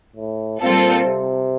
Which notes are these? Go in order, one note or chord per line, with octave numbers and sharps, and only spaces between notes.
A2
A#2 G3 C4 F4 A4
C3